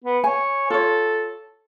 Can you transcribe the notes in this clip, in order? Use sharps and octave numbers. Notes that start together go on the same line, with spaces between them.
B3
C#5 G#5
F4 A4 C#5